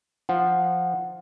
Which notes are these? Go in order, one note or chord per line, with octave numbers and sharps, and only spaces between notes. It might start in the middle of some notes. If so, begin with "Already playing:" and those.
F3 F#5